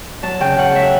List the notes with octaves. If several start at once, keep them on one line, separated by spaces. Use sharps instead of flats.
F#3 A5
C#3 G5
C#3 F#5
F#3 E5